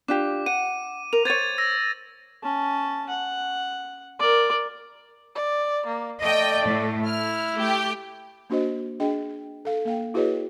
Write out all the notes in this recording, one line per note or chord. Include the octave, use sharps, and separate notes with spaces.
D4 F4 G4 D6
F#5 D#7
A#4 F7
C5 C#5 G#6 A6 D#7
E6 A#6
C#4 A5
F#5
A#4 D5
D5
A#3
A3 D5 D#5 G5
A2
E4 F6
A3 G4
A#3 D4 F#4 C5 D#5
D4 G#4 D#5 G5
A4 F5
A#3 F5 G5
E4 F#4 G#4 B4 C#5 D#5